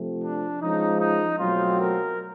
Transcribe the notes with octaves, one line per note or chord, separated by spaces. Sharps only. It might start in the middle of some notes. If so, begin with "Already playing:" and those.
Already playing: C3 F3 A3
D4
F3 G#3 C#4 D#4
D#4
B2 F#3 A3 C4 F4
A#4